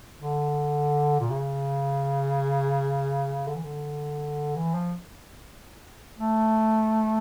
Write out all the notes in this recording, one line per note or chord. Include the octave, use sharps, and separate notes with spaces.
D3
A#2
C#3
D3
E3
D3
E3
F3
A3